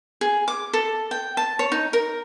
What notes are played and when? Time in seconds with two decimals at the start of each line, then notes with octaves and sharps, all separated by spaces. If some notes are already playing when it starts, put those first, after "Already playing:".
0.21 G#4
0.48 D6
0.73 A4
1.11 G5
1.37 A5
1.59 C#5
1.72 D#4
1.93 A#4